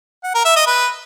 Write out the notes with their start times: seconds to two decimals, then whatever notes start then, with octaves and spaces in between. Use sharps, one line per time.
0.24 F#5
0.34 A#4
0.45 E5
0.56 D#5
0.67 B4